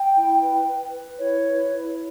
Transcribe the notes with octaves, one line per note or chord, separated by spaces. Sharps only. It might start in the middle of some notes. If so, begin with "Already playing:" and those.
Already playing: G5
E4
B4
B4
B4
E4 C#5
B4
E4